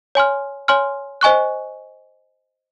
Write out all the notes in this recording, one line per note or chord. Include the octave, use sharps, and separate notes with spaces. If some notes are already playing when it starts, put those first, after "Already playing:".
C#5 G#5 C6 F6
C#5 G#5 C6 F6
C5 D#5 G#5 C#6 F#6